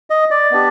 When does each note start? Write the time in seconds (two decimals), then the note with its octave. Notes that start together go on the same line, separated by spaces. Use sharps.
0.10 D#5
0.31 D5
0.51 B3 D4 G4